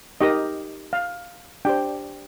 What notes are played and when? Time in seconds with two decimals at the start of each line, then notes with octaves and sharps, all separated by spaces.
0.21 D#4 G4 A#4 D#5
0.93 F5
1.65 D4 G4 C5 G5